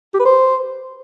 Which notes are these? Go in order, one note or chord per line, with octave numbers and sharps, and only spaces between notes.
G4
B4
C5